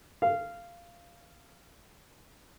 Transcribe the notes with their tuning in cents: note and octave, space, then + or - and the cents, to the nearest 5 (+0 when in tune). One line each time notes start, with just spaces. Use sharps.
F5 -15